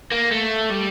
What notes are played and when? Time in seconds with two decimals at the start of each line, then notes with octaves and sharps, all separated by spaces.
0.12 A#3
0.31 A3
0.70 G3